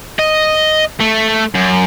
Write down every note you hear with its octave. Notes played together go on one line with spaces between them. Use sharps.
D#5
A3
F#2